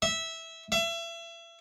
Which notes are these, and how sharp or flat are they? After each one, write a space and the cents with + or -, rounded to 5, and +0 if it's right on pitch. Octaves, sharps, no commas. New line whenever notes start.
E5 -15
E5 +30